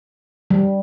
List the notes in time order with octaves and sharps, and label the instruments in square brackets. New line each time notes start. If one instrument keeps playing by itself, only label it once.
[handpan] G3